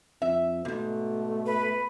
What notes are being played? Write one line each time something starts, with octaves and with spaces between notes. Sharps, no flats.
F2 E5
E2 G#2 B2 A3
B4